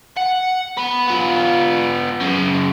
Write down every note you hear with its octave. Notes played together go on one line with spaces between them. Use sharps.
F#5
B3 B4
B3 F4
F#2 C#3